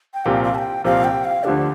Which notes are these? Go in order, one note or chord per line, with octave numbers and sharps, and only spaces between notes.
G5
C2 A#2 F3 C4 G4 F5
F5
A5
G5
C2 A#2 F3 C4 G4 F5
G5
F5
D2 D3 F3 D4 G4